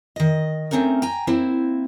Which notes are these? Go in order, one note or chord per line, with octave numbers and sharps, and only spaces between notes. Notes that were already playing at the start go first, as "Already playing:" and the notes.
D#3 D#5
A3 C4 C#4 D#4 A#4
G5 G#5 A#5
A#3 C4 E4 C5